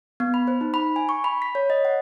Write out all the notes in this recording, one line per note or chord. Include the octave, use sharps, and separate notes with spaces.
B3
B5
C5
D#4
B5
G#5
C#6
B5
B6
C#5
D#5
F#5